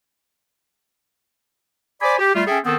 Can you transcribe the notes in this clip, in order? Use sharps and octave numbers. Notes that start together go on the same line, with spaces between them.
C5 D5 G#5 B5 D6
G4
G3 A3 F4
C#4 G#4 A4 E5 G5
D#3 B3 C4 A4 D#6